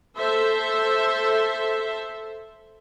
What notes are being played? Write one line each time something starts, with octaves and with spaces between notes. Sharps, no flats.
A4 C5 E5